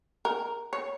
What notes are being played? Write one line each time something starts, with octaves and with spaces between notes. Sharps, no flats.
A#4
C#5